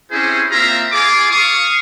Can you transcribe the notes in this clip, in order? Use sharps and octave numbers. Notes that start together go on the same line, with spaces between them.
C4 C#4 E4 G4 G#4 C5
A#3 C4 F4 E5 F5 A#5
F4 G#4 D6
F5 C#6 D#6